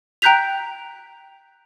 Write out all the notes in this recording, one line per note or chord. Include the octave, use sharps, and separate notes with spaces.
G5 A#5 F#6 G6 B6 F7